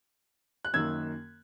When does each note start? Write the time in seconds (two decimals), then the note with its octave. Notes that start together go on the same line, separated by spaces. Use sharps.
0.65 F#6
0.73 F#2 D#3 A#3 E6 G#6